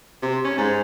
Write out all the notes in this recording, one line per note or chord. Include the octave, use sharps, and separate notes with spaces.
C3
C#4
G#2